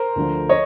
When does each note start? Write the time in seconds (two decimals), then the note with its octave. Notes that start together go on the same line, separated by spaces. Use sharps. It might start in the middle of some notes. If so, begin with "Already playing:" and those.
Already playing: A#4 C5
0.16 D2 D3 F3
0.49 C#5 D#5